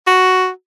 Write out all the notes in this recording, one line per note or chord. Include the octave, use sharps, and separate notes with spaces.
F#4